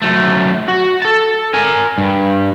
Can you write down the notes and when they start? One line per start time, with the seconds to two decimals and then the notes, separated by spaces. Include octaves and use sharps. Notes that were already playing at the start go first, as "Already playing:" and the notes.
0.02 F#2 A3
0.68 F#4
1.02 A4 A5
1.53 A#4 G#5
1.98 G2